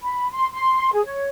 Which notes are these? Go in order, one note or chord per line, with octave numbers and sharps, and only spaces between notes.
B5
C6
C6
G#4
C#5